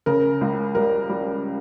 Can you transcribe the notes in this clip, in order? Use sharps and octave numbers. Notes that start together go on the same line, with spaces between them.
C#3 A#4
C#2
G3 A#4
G3